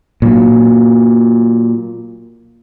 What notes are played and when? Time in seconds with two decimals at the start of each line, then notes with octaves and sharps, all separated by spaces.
0.22 A#2 F#3